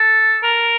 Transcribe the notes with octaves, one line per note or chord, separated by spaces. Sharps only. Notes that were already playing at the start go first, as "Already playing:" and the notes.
Already playing: A4
A#4